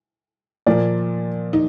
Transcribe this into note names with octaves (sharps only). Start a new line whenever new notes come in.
A#2 F3 A#3 D5
D#4